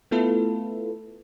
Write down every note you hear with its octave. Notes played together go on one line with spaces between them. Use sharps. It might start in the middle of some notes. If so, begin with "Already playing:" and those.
A3 B3 E4 F4 A4 B4